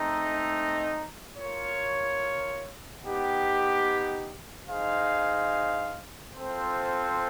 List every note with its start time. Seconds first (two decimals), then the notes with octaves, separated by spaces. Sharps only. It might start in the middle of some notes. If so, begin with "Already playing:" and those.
Already playing: A3 C4 D#4
1.37 F4 A#4 C#5
3.02 B3 D#4 G4
4.68 D#4 G#4 C5 F5
6.33 C4 F4 A4 C5